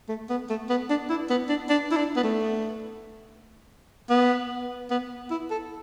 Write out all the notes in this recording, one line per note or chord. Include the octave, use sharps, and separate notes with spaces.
A3
B3
A3
B3
D4
E4
B3
D4
D4
E4
D4
B3
A3
B3
B3
E4
A4